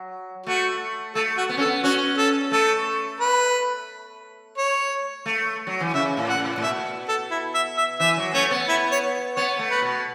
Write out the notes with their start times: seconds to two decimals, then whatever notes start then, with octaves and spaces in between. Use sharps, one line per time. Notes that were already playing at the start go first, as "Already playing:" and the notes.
Already playing: F#3
0.46 A3 F#4
1.15 A3 A4
1.37 F#4
1.49 B3
1.57 C#4
1.61 A4
1.66 B3
1.83 C#4 F#4
2.18 A4
2.51 A3 A4
3.20 B4
4.57 C#5
5.26 A3
5.67 F#3
5.80 E3
5.94 C#3 E5
6.17 A2
6.29 F#5
6.40 A2
6.58 A2
6.62 B2 E5
7.08 A4
7.31 E4
7.54 E5
7.77 E5
7.99 E3 E5
8.17 F#3
8.34 A3 C#4
8.51 B3
8.68 E4
8.91 C#5
9.36 B3 C#5
9.59 A3
9.71 B4
9.82 B2